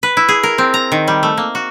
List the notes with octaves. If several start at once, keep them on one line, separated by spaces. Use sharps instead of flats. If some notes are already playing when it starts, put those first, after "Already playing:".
B4
E4
G#4
A#4
C4
A#5
D#3
G3
A3
A#3
F#4